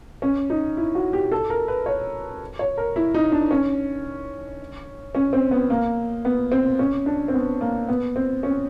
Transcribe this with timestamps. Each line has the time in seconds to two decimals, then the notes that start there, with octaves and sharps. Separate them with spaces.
0.22 C#4
0.50 D#4
0.77 E4
0.95 F#4
1.13 G4
1.32 A4
1.50 A#4
1.68 B4
1.86 C#5
2.59 C#5
2.77 A#4
2.96 E4
3.14 D#4
3.32 D4
3.51 C#4
5.15 C#4
5.33 C4
5.51 B3
5.70 A#3
6.25 B3
6.52 C4
6.79 C#4
7.06 D4
7.28 C4
7.34 B3
7.61 A#3
7.88 B3
8.16 C4
8.43 C#4